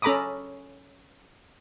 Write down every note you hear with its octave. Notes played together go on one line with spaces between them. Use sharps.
C#4 A4 A#5 B5 D6 D#6